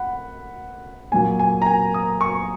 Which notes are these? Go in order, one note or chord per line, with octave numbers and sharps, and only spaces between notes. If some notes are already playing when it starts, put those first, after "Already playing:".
Already playing: F#5 B5
A#2 F#3 A#3 G#5
G#5
A#5
G#5
D#6
C#6